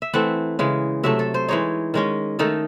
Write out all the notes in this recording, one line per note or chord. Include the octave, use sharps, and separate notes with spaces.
E5
E3 A3 C4 F#5
C#3 E3 G#3
C3 F#3 A3 E5
A4
C5
E3 G#3 D#4 C#5
D#3 G#3 C#4
D#3 A3 D#4 A4